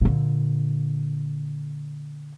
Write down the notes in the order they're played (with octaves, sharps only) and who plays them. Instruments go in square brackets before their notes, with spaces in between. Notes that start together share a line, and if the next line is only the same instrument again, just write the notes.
[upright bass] A#2 D3